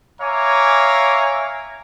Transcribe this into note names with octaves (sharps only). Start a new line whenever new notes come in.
C#5 E5 F5 G#5 A#5 D6